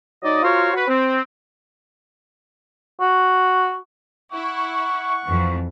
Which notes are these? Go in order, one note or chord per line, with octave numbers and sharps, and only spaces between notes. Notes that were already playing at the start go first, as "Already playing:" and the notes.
F#3 D#4 D5 D#5
F4 F#4 A#4 C5 C#5
F#4 B4
C4
F#4
E4 F#5 C#6
F2 E3